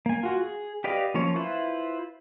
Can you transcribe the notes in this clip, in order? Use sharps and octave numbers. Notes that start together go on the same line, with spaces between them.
A#3 G#5
F4 F#4
G#4
G4 B4 D5 D#5 F5
F3 A#3 C#4 C#5
E4 F4 B4 C5